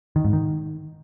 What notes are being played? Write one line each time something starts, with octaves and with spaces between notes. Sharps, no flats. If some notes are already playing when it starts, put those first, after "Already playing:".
D#3
G#2
D#3